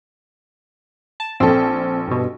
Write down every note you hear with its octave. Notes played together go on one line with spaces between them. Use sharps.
A5
A#1 C4 A4
G2 B2